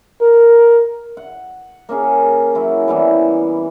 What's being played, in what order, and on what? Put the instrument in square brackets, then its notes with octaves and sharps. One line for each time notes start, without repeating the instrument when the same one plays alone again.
[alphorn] A#4
[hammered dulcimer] F#5
A#3 C#4 G#4
F#3 E4 F#4
E3 G3 B3